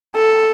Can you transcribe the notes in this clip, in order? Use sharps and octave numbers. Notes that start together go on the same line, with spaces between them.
A4